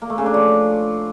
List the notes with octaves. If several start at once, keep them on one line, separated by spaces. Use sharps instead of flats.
A#3
A3
C#3
D4
F3